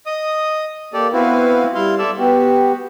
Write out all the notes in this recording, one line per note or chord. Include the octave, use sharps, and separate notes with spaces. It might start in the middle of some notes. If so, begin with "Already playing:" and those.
D#5 D#6
A#3 G4 A4 D5
B3 C4 E4 F#4 B4 F5
G3 E4 F5 C6
A4 D5 E5
B3 F#4 G4